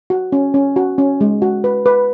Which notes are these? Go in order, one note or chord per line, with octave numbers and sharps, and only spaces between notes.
F#4
C#4
C#4
F#4
C#4
G#3
F#4
B4
B4